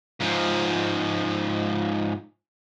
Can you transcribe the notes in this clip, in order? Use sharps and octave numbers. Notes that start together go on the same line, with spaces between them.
G#2 F3